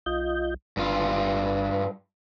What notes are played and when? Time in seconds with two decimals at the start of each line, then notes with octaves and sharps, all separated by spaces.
0.06 B1 F4 D#5 G6
0.77 G1 G2 F4 B4